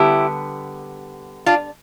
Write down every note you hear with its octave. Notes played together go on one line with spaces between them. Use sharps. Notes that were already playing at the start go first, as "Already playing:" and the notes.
Already playing: D3 G3 B3 E4 G4
D4 F4